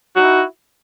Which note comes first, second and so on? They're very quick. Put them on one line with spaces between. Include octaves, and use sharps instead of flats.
F#4 D#4 E4